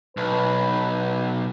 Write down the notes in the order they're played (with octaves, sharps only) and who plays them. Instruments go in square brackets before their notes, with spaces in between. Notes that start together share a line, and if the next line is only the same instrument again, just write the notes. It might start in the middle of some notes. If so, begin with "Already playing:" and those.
[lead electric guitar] B1 [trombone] B4